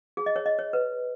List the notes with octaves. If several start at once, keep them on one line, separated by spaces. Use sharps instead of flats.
G#4
D#5
C#5
D#5
C#5
B4